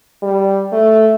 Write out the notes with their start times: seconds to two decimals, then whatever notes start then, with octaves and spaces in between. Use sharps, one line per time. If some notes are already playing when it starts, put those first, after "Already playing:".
0.23 G3
0.72 A3